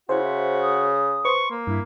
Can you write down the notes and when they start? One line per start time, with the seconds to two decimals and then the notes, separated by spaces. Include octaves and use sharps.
0.09 C#3 E4 F#4 C5
0.23 E5
0.61 D#6
1.25 B4 C5 C6 C#6
1.51 A#3
1.67 G2 E4